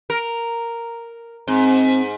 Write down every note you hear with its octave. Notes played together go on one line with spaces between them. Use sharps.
A#4
G#2 C4